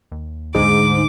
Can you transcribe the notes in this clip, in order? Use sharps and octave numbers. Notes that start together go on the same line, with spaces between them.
D#2
D2 G#2 D3 D6